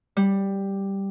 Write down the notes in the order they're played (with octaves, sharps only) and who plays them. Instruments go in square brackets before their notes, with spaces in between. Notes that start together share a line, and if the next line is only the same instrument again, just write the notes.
[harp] G3